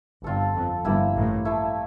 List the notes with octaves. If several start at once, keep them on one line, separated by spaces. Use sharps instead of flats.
G1 G2 C4 F4 A4
F2
G1 G2 A#3 E4 G4
A1 A2
F3 A3 E4